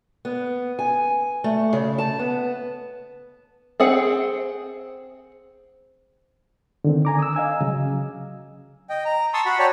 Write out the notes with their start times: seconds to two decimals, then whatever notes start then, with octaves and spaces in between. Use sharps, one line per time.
0.25 B3
0.79 G#5
1.44 A3
1.73 C#3
1.98 A5
2.19 B3
3.80 C4 G#4 F#5
6.84 D3 D#3 C4
7.05 G#5 A#5 D6
7.19 D#6 E6
7.35 D#5 F5 G#5 E6
7.61 C#3 F#3
8.90 D#5 G5
9.05 A#5
9.34 A5 C6 C#6 D#6 E6
9.46 F#4 F#5 B5
9.59 C#5 D5 G5 A5 A#5